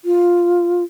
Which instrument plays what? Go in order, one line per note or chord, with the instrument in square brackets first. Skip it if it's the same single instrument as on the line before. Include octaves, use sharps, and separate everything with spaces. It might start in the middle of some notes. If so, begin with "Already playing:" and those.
[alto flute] F4